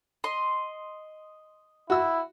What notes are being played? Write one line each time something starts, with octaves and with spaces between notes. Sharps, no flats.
D#5 C6
E4 F#4 E6